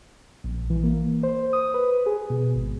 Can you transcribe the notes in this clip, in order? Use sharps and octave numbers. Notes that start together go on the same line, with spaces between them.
A#1
E3
A#3
C5
D#6
B4
G#4
B2
G#1